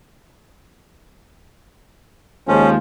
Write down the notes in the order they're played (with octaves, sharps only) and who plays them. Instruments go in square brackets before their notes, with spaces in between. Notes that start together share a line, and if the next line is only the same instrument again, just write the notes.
[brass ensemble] D#2 F3 G#3 [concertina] C#4